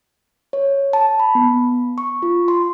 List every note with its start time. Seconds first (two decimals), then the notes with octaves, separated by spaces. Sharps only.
0.53 C#5
0.93 A5
1.19 B5
1.35 B3
1.98 C#6
2.23 F4
2.48 C6